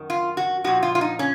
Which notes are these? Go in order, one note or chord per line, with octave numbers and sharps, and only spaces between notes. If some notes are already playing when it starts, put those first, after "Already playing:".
Already playing: F#2 D#3
F4
F#4
A#2 F3 F#4
F4
F4
D#4
C#4